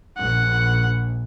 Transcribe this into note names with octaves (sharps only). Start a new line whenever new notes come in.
A#1 F#5